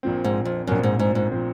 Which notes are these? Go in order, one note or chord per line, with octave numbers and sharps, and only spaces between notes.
A#1 A#2 F3 C4
G#2
F2
A#1 F#2 A#2 F3 C4
G#2
G#2
G#2
A#2 F3 C4